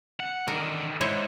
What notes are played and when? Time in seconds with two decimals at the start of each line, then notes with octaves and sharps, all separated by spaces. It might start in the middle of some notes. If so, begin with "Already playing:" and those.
0.20 F#5
0.48 D3 D#3 A#4
1.01 G#2 E4 C5 C#5